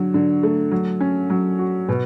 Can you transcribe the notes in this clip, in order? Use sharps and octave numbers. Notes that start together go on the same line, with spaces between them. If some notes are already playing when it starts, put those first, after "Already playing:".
Already playing: D3 F#3
D3
A3
F#3
C#4
F#3
F#4
B2